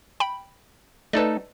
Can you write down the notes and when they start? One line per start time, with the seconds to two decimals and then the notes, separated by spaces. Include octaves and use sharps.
0.20 G5 B5
1.13 A3 D#4 A4 B4 D5